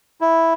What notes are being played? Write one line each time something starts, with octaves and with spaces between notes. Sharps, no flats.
E4